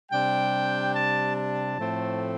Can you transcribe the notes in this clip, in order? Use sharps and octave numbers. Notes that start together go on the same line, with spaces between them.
C3 G3 D4 G5
A5
A5
A2 F3 A3 C4